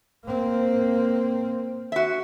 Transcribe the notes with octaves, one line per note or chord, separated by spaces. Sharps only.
A#3 C4
F#4 E5